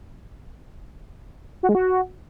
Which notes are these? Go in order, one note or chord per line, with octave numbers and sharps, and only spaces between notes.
F#4
G#3
F#4